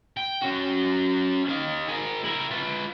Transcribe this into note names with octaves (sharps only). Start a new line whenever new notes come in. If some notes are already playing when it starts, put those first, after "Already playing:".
G5
C#4 F#4
D#4 F5
G#4 A#4
E4 A#4
F4 B4